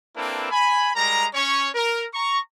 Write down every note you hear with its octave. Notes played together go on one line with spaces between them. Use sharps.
A#3 C4 D4 E4 A4 B4
G#5 B5
G3 G#3 A#4 A#5
C#4 C#5 C#6
A#4
A#5 C#6